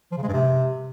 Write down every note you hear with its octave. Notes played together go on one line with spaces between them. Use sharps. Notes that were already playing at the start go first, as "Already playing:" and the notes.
F3
C#3
G#3
G2
C3